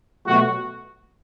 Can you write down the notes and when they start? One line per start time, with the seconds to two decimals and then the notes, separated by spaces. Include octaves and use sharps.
0.26 B2 F#3 A3 F#4